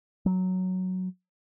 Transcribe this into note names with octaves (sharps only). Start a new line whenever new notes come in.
F#3